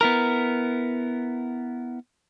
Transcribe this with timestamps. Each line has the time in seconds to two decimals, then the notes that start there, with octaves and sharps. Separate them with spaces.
0.01 B3 E4 A#4